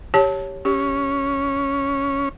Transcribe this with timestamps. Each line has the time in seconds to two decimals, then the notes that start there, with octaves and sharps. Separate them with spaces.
0.14 G4 C#5 A5
0.65 C#4 G4